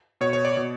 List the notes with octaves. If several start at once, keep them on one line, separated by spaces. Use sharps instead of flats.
B2 C#5
C#5
D5
B2